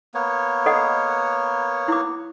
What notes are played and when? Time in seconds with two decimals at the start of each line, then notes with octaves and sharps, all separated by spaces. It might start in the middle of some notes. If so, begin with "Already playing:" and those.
0.14 A#3 B3 C#5
0.66 A4 D#5 F#5
1.88 E4 D6